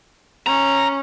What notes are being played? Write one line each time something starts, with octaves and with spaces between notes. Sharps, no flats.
C#4 A#5